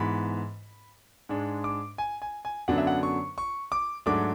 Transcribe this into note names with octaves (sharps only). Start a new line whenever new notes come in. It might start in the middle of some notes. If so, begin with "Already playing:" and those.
Already playing: G#2 E3 B3 B5
G#2 G#3 D4
D6
G#5
G#5
G#5
F#2 D3 F#3 B3 D4 F#5
E5
F#5
C#6
C#6
D6
G#2 F#3 A3 D4 D6